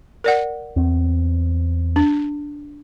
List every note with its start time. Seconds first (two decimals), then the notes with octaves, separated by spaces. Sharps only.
0.24 A#4 D5 F#5
0.76 E2 C4
1.96 D4